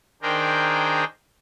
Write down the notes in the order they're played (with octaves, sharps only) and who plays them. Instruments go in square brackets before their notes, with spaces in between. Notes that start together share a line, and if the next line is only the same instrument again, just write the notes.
[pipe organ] D#3 D4 G#4 A#4 C5 G5